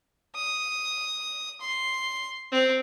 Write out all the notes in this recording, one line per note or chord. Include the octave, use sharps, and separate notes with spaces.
D#6
C6
C4